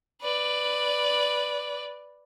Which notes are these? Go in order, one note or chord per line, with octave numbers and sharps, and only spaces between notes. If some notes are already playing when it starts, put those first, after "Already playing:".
B4 D5